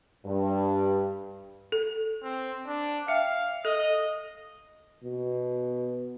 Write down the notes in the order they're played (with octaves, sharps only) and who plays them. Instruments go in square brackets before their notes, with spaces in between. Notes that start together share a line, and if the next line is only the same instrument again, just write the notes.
[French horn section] G2
[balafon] A4
[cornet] C4
D4
[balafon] E5 G5 [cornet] F5
[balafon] A4 [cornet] D#5
[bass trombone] B2